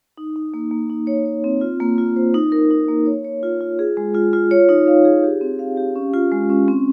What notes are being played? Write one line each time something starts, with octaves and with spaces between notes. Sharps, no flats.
D#4
D#4
A#3
A#3
D#4
C#5
C#5
C4
F4
A#3
F4
C5
D#4
A#4
D#4
A#3
C#5
C#5
F4
F4
G#4
G#3
F4
F4
C#5
D#4
F5
G#4
G4
C4
F5
G4
C#4
F4
G#3
C#4
C4